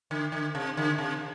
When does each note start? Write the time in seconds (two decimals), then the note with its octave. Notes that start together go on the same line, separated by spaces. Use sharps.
0.11 D3
0.32 D3
0.55 C3
0.77 D3
0.98 C3